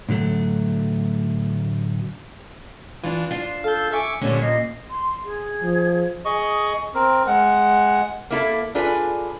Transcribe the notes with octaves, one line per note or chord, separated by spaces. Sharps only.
A2 D3 F#3 A3
E3 D4 F4
D4 F4 C7
A4 F5 G6
E5 G#5 C#6 D6
A#2 D3 G3 C#4 C#5
D#5 C7
C6
G#4
F3
G#4 D#5 C#6
C4 A#4
G#3 F#5
A#3 E4 A4
D4 F4 G#4 A4 B4